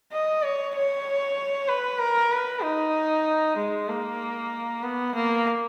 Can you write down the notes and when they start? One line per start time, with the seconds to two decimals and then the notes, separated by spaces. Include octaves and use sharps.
0.12 D#5
0.43 C#5
0.75 C#5
1.68 B4
2.01 A#4
2.32 B4
2.63 D#4
3.57 G#3
3.89 A#3
4.83 B3
5.15 A#3